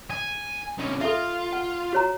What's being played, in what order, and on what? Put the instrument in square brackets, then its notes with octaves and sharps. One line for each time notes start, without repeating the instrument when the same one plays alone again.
[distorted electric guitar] G#5
C2 C#4
[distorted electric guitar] F4 [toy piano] A4 E5
[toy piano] F#5
F#4 C#5 A#5